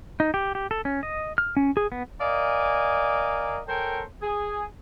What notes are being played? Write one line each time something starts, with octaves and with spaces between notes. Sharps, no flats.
D#4
G4
G4
A4
C#4
D#5
F6
C#4
G#4
B3
A#4 D5 D#5 F5 G#5
A4 A#4 C5 C#5 G5 G#5
G#4